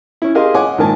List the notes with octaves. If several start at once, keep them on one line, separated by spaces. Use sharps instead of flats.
C#4 E4
G4 G#4 A#4 D#5 F5 C6
C#5 D#5 F#5 G#5 D6
A#1 G#2 D#3 A#4 G#5 A5